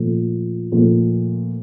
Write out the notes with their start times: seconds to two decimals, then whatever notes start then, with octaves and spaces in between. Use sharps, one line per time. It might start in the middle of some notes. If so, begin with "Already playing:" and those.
Already playing: A#2 F3 A3
0.72 A#2 F3 A3